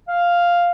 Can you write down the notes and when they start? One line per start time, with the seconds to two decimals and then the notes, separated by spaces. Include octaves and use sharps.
0.08 F5